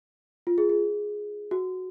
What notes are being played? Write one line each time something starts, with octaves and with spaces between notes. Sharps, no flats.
F4
G#4
G#4
F#4